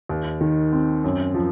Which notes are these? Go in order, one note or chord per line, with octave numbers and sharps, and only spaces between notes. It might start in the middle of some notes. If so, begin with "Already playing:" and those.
D#2
D#3
C4
F#2
F3